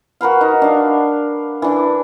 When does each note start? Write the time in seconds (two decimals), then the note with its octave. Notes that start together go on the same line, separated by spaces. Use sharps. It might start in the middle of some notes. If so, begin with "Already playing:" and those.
0.21 F#4 A#4 B4 F5
0.41 D#4 D#5
0.62 D4 F5
1.62 E3 D4